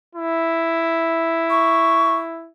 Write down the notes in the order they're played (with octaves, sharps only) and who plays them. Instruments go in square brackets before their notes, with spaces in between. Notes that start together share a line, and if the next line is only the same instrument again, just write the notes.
[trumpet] E4
[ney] C#6